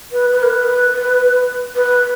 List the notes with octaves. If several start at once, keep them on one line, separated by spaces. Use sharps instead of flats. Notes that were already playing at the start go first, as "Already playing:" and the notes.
B4
B4
A#4
B4
B4